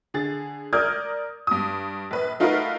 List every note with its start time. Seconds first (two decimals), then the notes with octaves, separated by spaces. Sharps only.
0.14 D3 G#4 A6
0.73 A#4 D5 D#6 F6 G6 G#6
1.47 G2 D#6
2.11 A#1 B4
2.40 A3 D#4 F4 F#4 A#4 B4